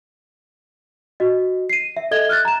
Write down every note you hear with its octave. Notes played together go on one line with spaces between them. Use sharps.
F#4 D#5
C7 D#7
E5
A4 D#5 E5 G#6 G7
F6 F#6 A6
A#5 E7